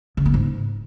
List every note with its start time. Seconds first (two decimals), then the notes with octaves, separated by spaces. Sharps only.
0.17 C#3
0.26 A#3
0.34 G#2